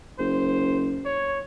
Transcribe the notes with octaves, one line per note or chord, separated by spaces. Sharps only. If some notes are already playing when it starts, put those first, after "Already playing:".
F#1 C5
C#5